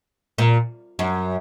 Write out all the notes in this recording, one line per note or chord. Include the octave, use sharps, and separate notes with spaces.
A#2
F#2